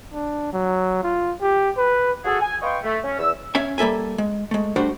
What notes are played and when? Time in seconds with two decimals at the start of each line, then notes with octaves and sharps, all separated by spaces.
0.14 D4
0.53 F#3
1.03 F4
1.41 G4
1.77 B4
2.25 F#4 G#4 A4
2.40 G#5
2.62 B4 D#5 F5 G5 C6 C#6
2.83 A3
3.04 C#4
3.18 E2 E6
3.55 C#4 E5 G#5
3.78 G3 A#3 A4 E5 G#5
4.18 G#3
4.51 G#3 A3
4.76 G3 A3 D4 F#4 C5